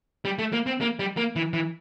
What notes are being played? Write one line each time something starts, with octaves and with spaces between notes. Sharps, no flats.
G3
A3
A#3
C4
A#3
G3
A#3
E3
E3